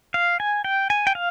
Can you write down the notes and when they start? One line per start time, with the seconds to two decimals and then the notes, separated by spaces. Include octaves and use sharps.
0.14 F5
0.40 G#5
0.64 G5
0.90 G#5
1.07 G5
1.15 F5